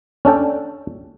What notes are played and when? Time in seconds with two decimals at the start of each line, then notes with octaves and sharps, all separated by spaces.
0.25 C#4 D4 A4 G5